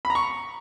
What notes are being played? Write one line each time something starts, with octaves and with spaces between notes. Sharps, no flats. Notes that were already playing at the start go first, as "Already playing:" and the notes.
B5
A#5
C#6